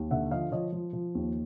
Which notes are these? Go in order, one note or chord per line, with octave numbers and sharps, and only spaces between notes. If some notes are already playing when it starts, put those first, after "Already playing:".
Already playing: D#2
D3 E5 F#5
F3 D#5 F5
F3 C#5 D#5
F3
F3
D#2